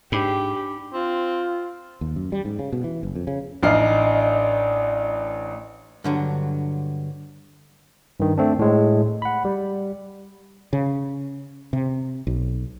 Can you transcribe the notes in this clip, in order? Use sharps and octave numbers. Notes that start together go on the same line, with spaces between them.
G#2 D4 G4 B5 D6
C4 F4
D#2
F#2
G3
G#2
C#3
B2
E3
F#1
F2
C#3
A1 D4 D#4 F6 C7
G2 D3 F#3
G2 D#3
A3 C4 D4
A2 G#3
F#5 B5
G3
C#3
C3
B1